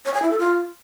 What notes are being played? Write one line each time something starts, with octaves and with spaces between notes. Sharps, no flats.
C#5
G#5
E4
A4
F4